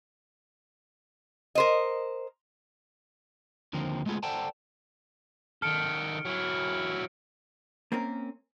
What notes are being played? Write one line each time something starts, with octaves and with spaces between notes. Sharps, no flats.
A#4 C5 D#5
D#2 D3 F3 A#3 C4
G#3 A3 B3 F4 G#4
A4 C5 D5 F#5 G5 A5
D#3 A4 F6 C#7 D7
F#3 E4
A#3 C4 C#4 A#4